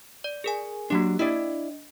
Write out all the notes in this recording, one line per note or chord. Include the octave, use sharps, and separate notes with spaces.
D5
G#4 A#4 G#5
F#3 A#3 D4 G4
D4 E4 D5 D#5